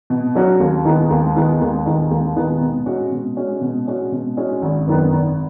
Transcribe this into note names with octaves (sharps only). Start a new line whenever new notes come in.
B2
F#3 C#4 F#4
D#2
D#3 G#3 B3
D#2
D#3 G#3 B3
D#2
D#3 G#3 B3
D#2
D#3 G#3 B3
B2
G#3 C#4 F#4
B2
G#3 C#4 F#4
B2
G#3 C#4 F#4
B2
G#3 C#4 F#4
G#1
F#2 D#3 B3
G#1